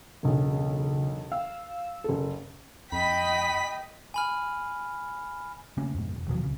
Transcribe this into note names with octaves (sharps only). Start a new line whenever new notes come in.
E1 B1 C#3
F5 E6
F#1 A4
F2 D#5 G5 B5 B6
G#5 B5 F6
C#3 A3 A#3 C#4
F2 G#2 B2
E1
D#2 B2 F3 F#3
C2 C#3